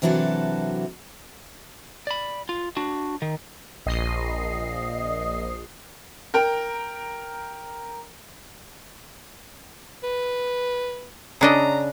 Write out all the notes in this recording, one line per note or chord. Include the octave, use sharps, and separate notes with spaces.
C3 E3 F#3 D4 F#4 A4
D5 B5
F4
D4 F#4
D#3
A#1 D#5 C7
A#4 G5 A#5
B4
C#3 D4 D#5 A#5